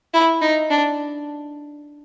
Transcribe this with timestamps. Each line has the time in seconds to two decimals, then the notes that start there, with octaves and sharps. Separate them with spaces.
0.14 E4
0.42 D#4
0.70 D4